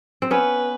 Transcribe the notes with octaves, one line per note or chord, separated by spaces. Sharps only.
C4
B3 C#4 B4